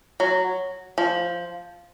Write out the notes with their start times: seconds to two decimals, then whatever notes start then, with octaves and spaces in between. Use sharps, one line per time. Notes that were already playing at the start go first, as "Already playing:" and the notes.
0.20 F#3
0.98 F3